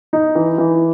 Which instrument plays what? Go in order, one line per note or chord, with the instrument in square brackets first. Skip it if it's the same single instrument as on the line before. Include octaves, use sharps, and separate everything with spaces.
[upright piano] D#4
E3
E3